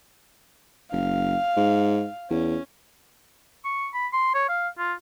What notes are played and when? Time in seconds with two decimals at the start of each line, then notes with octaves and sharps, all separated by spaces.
0.92 F#1 F5
1.57 G#2
2.30 E2 C#4
3.65 C#6
3.94 B5
4.13 C6
4.35 C#5
4.49 F5
4.78 F4